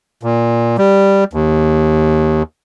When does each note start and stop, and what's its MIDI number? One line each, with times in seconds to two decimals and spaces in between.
0.23 0.77 46
0.78 1.24 55
1.33 2.43 39